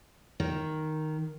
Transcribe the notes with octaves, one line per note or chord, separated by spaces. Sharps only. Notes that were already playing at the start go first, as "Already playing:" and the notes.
D#3